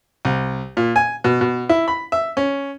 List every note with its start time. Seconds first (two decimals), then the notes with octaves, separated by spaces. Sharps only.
0.25 C2
0.77 A#2
0.96 G#5
1.24 B2
1.41 B2
1.69 E4
1.88 B5
2.12 E5
2.37 C#4